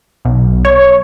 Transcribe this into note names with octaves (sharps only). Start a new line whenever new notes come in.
B1
C#5